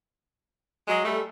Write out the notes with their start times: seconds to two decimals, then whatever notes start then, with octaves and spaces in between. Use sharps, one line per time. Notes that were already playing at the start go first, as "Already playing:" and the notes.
0.88 F#3 G#3
1.05 G3 A3